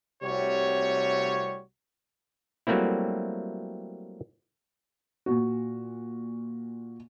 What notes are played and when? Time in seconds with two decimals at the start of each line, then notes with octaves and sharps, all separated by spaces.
0.23 C2 C3 G3 A3 F#4 C#5
2.67 F#3 G3 A3 A#3 C4 E4
5.26 A#2 F#4